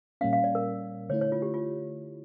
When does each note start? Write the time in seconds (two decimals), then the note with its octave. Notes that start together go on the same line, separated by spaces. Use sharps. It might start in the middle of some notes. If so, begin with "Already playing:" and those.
0.21 A#2 G3 A#3 C#4 F5
0.33 F5
0.44 D5
0.55 A#4
1.09 D3 A3 E4 C#5
1.21 C#5
1.32 F4
1.42 G4
1.54 F4